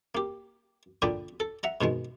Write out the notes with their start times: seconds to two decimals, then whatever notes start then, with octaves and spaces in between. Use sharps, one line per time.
0.15 A#3 G4
1.02 A#2 D3 D5 G5 B5 D#6
1.40 A4
1.63 E5 F#5 A#5
1.81 G#2 B2 D#3 G#3